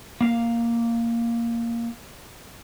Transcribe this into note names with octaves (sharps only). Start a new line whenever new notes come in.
A#3 F5